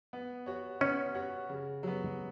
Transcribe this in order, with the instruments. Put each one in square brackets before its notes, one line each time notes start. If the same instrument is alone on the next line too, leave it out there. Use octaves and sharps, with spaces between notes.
[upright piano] B3
F#4 C#5
[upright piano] B3 [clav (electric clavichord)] C#4
[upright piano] F#4 C#5
C#3
F#3 B3